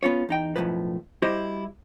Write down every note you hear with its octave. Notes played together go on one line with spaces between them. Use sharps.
B3 C#4 F4 C#5
E2 D#4 G5
B1 F#2 A2 D#3 F3 B4
G3 E4 F#4 G4 C5 D#5